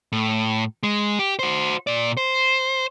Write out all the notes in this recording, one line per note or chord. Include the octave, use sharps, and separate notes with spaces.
A2
G#3
G4
F#4 C5
A#2 D5
C5